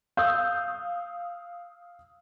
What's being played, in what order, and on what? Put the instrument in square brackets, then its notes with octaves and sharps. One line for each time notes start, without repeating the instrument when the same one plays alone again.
[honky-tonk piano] F5 D#6 E6 G6